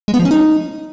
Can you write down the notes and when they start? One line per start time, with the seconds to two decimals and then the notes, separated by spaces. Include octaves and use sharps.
0.08 G#3
0.14 B3
0.19 F3
0.25 C#4
0.31 D#4